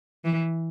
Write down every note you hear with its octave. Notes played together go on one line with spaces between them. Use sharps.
E3